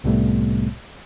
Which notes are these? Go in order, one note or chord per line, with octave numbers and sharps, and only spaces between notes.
C2 A2 C3 G3 A3 B3